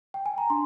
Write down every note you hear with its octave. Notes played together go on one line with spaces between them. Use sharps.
G5
G#5
A#5
D4 C6